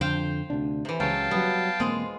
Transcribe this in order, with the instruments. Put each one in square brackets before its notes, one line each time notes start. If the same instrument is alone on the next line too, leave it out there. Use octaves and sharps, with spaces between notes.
[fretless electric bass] F2 D3 [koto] C5 F5 G5
[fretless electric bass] D2 C3 D4
[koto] C3 E3
[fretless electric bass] C#2 C#3 [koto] F#3 [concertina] F5 G5 A5
[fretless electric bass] F#3 G3 [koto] B3
[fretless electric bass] E1 A#3 C4 [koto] G#3 F4